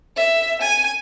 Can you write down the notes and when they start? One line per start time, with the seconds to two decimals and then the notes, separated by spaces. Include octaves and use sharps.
0.16 E5
0.62 G#5